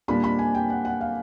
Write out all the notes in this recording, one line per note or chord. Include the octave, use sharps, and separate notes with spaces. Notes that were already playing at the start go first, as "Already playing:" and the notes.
A#2 G3 A#3 D4 B5
B5
G#5
G5
F#5
F#5
F5